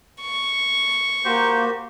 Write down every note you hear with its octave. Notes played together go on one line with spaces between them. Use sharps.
C#6
A#3 F#4 G4 C5